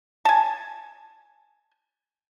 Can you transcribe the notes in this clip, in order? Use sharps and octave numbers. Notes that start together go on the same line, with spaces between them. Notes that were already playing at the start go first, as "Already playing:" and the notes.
G#5 A5